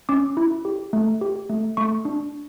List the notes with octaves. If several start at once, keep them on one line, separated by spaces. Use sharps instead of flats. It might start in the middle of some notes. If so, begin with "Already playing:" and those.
C#4 D6
E4
G4
A3
G4
A3
A3 C#6
D4